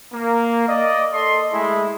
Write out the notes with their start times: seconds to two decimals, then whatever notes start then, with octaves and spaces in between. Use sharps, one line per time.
0.13 A#3
0.68 D5 D#5
1.13 A4 D#5 C6
1.53 G#3 A3 E4 G#4